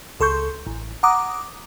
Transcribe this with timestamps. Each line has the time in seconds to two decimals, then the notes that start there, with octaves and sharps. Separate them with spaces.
0.20 C#2 A4 C6 C#6 G6
0.67 A1
1.03 F#5 A#5 D6 D#6